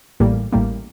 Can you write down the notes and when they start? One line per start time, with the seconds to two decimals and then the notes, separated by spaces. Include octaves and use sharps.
0.20 A1 A2 G3 A#3
0.52 A1 A2 G3 A#3